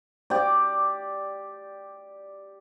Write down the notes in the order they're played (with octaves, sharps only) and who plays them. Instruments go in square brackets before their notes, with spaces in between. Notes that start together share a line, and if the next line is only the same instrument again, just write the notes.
[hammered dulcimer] G4 D5